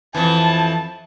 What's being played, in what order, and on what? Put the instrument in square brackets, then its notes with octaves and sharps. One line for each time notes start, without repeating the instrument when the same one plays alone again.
[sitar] F2 E3 [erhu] A5